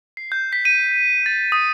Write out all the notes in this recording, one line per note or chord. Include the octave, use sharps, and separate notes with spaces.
C7
G6
B6
D#7
A6
D#6